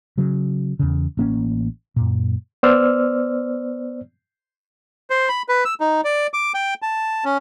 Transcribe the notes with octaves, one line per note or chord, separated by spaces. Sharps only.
C#3 F#3
E2 C#3
A1 A#3 C#4
F#2 A#2
B3 C5 D5 E6 F6
C5
B5
B4
E6
D#4
D5
D6
G5
A5
C#4